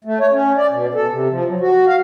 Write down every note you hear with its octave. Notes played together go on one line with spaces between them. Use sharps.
A3
C#5
C#4
D5
B2
A4
C3
F3
F#3
F#4
F5